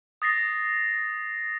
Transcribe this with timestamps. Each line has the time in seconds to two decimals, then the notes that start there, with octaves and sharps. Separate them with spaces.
0.22 D#6 A6 A#6 C7